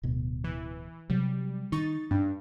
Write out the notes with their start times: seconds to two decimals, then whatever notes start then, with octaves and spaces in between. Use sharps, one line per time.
0.03 D1 B2
0.44 E3
1.10 C3 F#3 G3
1.72 D#3 D#4 C#6 A6
2.11 G2 D4